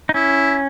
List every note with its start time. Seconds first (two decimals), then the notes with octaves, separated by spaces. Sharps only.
0.09 D#4
0.14 C#4 E4